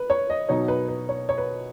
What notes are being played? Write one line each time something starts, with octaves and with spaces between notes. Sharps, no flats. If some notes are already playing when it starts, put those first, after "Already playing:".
Already playing: B4
C#5
D#5
B2 F#3 D#4 C#5
B4
B4
C#5
C#5
B4